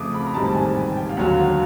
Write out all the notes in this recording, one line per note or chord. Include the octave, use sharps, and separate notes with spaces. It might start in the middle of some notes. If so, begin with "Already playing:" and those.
Already playing: F2 C#3 F3 A3 D6 D#6
B5
A#5
A1 G#2 D#3 G3 C4 A5
G#5
G5
G5
F5
D#2 D3 F#3 F#5
F5